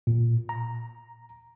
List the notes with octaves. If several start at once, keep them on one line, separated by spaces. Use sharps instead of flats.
A#2
A#5